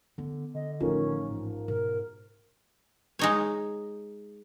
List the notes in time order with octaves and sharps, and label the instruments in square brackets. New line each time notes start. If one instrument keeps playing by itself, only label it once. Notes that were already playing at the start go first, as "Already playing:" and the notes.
[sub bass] D3 [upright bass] B3 C#4
[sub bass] D3 [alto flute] D#5
[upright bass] A1 [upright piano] F3 D#4 A#4 [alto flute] C#4
[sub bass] G#2
[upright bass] B2 [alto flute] A#4
[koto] G#3 D#4 C#5